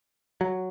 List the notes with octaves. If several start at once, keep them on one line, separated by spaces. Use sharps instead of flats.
F#3